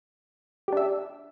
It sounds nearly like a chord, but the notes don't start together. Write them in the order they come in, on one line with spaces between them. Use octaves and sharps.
G4 D4 E5